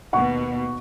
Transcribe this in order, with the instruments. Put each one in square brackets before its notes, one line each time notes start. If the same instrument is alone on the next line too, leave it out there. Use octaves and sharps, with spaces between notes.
[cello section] D#2 B2 A#3 [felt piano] F#5 C#6